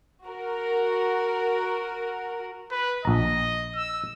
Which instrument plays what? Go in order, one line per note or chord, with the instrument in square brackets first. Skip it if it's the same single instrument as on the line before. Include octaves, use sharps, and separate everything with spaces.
[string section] F#4 A#4
[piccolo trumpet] B4
[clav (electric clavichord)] A#1 A#5 [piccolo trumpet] D#5
[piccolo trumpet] E6